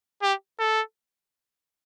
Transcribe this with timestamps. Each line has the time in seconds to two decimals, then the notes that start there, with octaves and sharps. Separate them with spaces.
0.23 G4
0.59 A4